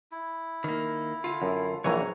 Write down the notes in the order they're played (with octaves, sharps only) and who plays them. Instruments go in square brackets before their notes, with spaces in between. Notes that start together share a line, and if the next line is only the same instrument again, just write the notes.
[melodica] E4
[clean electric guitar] D#3 A#3
D3 F4
[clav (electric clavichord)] F#2
[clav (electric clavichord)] A#1 E3 C#5 [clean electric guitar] F#3 G#4 A#5